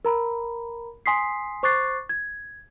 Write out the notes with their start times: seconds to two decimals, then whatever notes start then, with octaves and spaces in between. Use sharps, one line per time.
0.05 A#4 A#5 B5
1.06 G#5 C6 D#6 B6 C7
1.63 C5 C#6 D6 F#6 A6 C7
2.09 G#6